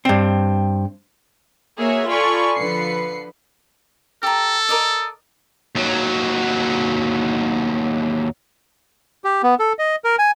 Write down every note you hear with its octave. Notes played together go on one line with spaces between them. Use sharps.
G2 C4
A#3 F#4 G#4 C#5 E5
F4 A4 D5 G#5 B5 C#6
D3 F3 B4 C7 C#7
G4 A4 A#5
A#4 D5 D#5
D#2 F#3
G4
B3
A4
D#5
A#4
G#5